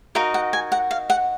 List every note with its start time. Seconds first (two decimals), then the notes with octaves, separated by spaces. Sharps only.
0.15 D#4 F#4 A#4 D#5 F5
0.34 F#5
0.53 G#5
0.72 F#5
0.91 F5
1.10 F#5